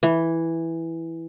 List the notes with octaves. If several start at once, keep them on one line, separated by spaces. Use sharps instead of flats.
E3